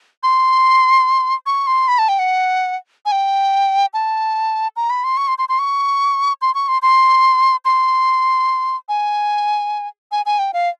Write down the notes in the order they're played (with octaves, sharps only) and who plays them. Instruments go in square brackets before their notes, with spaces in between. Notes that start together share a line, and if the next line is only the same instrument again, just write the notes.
[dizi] C6
C#6
C6
B5
A5
G5
F#5
G#5
G5
A5
A#5
B5
C6
C#6
C6
C6
C6
C#6
C6
C#6
C6
C6
C6
G#5
G#5
G#5
G5
F5